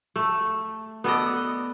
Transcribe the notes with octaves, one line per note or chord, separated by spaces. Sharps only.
A3
B3 A4 D5 D#5